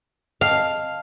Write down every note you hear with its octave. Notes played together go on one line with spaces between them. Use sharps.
D#5 F5 G5 A5